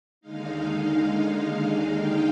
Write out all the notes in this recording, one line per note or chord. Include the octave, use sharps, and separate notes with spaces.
D#2 D3 G#3 D#4 F5
G5